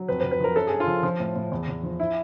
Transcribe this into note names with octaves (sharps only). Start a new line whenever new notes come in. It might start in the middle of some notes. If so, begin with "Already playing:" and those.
Already playing: F#3
F2 B4
B4
F2
B4
F3 A#4
F#2 A4
F#2 G#4
F4
F3
F3
A2
A2
E2
E2
F3
E4